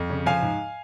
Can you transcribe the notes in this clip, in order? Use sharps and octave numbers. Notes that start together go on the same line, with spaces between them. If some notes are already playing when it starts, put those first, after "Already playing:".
Already playing: F2
C#3
F3 F5 G#5
G#2